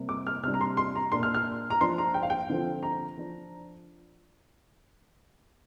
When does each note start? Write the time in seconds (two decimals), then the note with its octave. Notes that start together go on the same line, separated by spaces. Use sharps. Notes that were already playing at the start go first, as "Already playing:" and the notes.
Already playing: C3 G3 A#3
0.09 D6
0.27 F6
0.43 C3 G3 D4 F6
0.54 A#5
0.61 C6
0.77 C6
0.96 A#5
1.12 A#2 A#3 D4 C6
1.23 F6
1.34 F6
1.70 A#5
1.80 F3 D4 C6
1.98 A#5
2.14 G5
2.23 F5
2.30 G5
2.50 D3 F3 C4
2.83 A#5
3.18 F3 D4